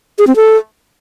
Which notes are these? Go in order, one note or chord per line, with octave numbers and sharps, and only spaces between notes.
G#4
C4
A4